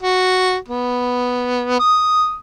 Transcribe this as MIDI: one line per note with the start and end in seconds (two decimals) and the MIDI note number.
0.03 0.57 66
0.68 1.78 59
1.80 2.36 87